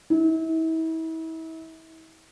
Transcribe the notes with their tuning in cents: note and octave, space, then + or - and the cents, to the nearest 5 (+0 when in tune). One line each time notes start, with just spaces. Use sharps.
E4 -35